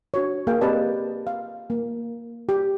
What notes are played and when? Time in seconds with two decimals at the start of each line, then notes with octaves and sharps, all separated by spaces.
0.14 D4 F#4 C#5
0.47 A#3 G#4 F5 G5
0.61 C4 G4 B4 D5 D#5 A5
1.27 F5
1.70 A#3
2.49 G4